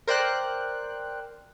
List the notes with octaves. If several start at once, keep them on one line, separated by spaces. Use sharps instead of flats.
A#4 C5 D5 G5 F#6